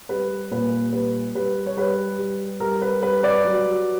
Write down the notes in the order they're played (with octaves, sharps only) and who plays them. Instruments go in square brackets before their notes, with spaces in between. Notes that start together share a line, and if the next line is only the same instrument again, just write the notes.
[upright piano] G3 B4
A#2 B4
G3 B4
G3 B4
C#5
G3 B4
G3
G3 A#4
B4
G3 B4
B4 D5
F#3